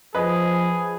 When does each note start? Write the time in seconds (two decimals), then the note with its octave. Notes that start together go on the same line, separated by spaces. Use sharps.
0.15 F3 G#4 B4 D#5